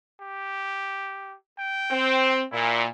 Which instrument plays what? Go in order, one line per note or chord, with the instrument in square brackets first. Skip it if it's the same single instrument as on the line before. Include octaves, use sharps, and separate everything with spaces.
[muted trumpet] G4
G5
[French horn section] C4
[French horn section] A#2 [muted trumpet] E4